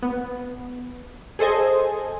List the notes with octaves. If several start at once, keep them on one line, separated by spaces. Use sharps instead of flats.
B3
G#4 A4 C5 D#5 G#5